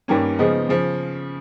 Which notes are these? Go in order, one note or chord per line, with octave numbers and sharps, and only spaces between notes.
G2 D#3 G3 A#3 C#4
C#3 F3 G#3 B3 D#4
C#3 F3